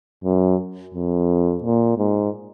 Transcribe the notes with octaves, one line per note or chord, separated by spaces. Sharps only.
F#2
F2
A#2
G#2